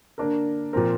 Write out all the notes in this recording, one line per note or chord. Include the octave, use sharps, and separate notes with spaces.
D3 A#3 D4 A#4
A#2 F3 C4 A#4